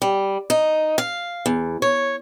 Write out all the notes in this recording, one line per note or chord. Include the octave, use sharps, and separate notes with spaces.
G3
D#4
F5
E2
C#5